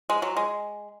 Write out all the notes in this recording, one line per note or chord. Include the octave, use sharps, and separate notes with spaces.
G#3
F#3
G#3